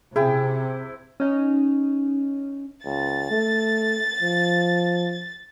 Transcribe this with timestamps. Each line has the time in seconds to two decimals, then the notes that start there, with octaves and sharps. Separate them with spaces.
0.16 C3 E4 G#4 G5
1.20 C#4 D#4
2.85 C#2 A6
3.31 A3
4.22 F3